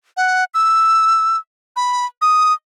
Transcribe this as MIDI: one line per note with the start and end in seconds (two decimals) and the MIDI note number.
0.17 0.44 78
0.54 1.37 88
1.76 2.06 83
2.22 2.53 87